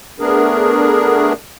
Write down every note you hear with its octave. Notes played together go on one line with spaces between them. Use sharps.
A3 B3 D4 G#4 A#4